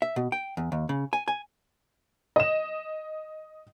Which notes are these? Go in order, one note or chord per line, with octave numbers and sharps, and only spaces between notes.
E5
B2
G5
E2
D#2
C#3
G#5
G#5
D#5 E7